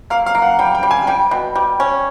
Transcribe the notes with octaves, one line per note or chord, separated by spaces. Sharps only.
A#3 F5
F5
A#3
F#5
G3 G5
G5
G3
G#5
G3 G5
B2
G3
C#4